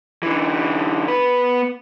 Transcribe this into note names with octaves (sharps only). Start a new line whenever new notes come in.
D3 E3
B3 B4